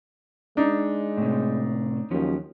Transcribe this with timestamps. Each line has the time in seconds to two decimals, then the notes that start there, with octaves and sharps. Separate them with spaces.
0.57 G#3 D4 D#4
1.18 A2 C3
2.11 D#2 F3 F#3 C#4